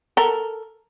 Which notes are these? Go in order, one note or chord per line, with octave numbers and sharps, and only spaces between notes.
A4 A#4